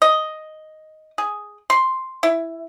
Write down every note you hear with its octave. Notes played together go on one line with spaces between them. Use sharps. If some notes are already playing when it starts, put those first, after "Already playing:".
D#5
G#4
C6
E4